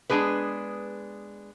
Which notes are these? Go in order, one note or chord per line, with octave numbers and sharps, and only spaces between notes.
G#3 B3 C4 D4 G#4 B4